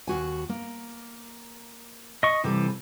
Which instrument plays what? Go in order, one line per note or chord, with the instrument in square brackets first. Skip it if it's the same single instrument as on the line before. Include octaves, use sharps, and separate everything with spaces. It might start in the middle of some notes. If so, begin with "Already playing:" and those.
[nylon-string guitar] D#2 F#4 G#5
A#3
[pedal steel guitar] D#5 C#6
[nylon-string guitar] C3 G3 A4 [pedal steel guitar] E3